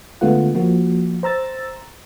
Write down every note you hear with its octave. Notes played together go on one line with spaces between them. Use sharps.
D3 G#3 A3 B3 F4 F#5
F3 A#3 F#4
C5 A#5 E6 A6